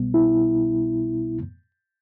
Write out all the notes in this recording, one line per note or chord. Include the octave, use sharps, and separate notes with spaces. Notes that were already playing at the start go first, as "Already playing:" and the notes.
Already playing: C2 B2 G3 B3
E4